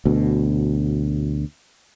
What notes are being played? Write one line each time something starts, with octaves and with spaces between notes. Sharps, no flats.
D2 B2